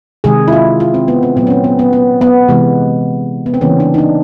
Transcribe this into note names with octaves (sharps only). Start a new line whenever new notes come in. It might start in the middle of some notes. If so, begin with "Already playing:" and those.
C3 D#3 G#3 G#4
E4
F4
F4
C4
B3
C4
A#2 F#3 A3 B3
C#4
C4
B3
B3
B3
B3
C3 E3 G#3
B3
C4
C#3 E3 G3 A#3 C#4
D4
D#4
D4